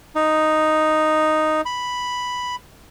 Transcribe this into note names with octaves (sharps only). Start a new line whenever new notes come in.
D#4
B5